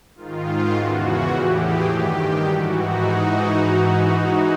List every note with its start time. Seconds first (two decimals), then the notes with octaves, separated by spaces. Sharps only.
0.15 G#2 D#3 F4
0.72 E2 C#3 E3 F#4
1.30 A2 E3 G4
1.57 G#4
1.86 G2 D#3 G4
2.43 G#2 E3 F#4
2.72 D#4